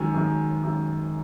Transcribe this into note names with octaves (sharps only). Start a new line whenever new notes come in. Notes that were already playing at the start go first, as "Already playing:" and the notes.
Already playing: F#2 D#3 G#3 G#5
F#2 D#3 G#3
F#2 D#3 G#3